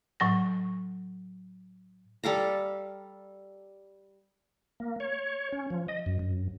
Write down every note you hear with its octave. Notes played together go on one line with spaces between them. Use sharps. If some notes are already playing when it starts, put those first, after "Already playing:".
A2 F#3 A#6
G3 A4 F5 A#5
A#3
C#5
C#4
F3
D#5
F#2
F#2